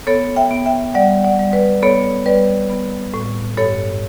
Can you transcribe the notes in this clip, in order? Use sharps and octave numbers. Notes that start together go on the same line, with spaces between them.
B3 A4 C#5
E5 G5
B3
E5 G5
G3 D5 F#5
D5 F#5
G3
B4 D5
B3 A4 C#5
G3 B4 D5
B3
A2
G2 A4 C#5